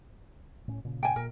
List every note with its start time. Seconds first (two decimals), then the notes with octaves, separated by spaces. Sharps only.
0.68 A2 C#4
0.85 A#2 C#3
1.03 G5 G#5
1.16 A#2 A#4